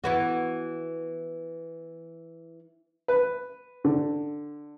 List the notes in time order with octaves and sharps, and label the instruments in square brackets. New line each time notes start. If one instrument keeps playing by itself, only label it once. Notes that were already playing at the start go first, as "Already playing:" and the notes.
[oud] E3 B3 F#4
[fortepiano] B4
D3